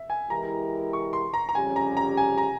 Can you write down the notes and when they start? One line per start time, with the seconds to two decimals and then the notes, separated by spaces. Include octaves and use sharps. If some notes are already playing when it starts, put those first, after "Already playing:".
Already playing: E5
0.10 G#5
0.30 E3 G#3 E4 G4 A#4 A#5
0.93 C#6
1.13 C6
1.34 A#5
1.49 A#5
1.55 F2 C#3 G3 C#4 G4 G#5
1.76 A#5
1.97 A#5
2.17 G#5
2.38 A#5